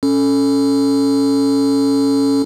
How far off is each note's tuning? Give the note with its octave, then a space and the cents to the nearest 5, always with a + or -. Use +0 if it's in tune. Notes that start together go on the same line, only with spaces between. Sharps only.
C#4 +0 A4 +0